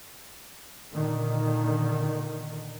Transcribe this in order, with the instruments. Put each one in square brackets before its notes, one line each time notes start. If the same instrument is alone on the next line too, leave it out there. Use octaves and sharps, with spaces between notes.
[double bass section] A#2 D3 D#3